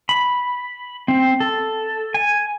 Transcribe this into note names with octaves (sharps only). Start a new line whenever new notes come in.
B5
C4
A4
G#5